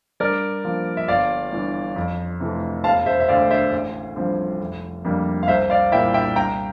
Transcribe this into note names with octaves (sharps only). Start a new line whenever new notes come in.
G2 A#4 D5
F3 A#3 D4
E5
G1 D5 F5
G2 E3
F2
C3 E3 A3
E1 F5 A5
C5 E5
E5
D2 D3 D5 F5
C5 E5
A1
G2 F3 C4
F1
F2 D3 G3 A#3
F5
C2 C5 E5
D5 F5
A#2 G3 A#3 E4 E5 G5
E5 G5
C2 G5 A#5